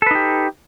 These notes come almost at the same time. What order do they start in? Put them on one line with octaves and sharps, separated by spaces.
A4 B4 D#4 G4